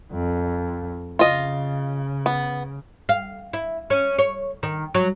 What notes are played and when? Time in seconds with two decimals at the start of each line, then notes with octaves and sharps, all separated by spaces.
0.12 F2
1.19 C#3 F4 D#5
2.26 B3
3.09 F5
3.53 E4
3.90 C#4
4.18 C#5
4.63 D#3
4.94 F#3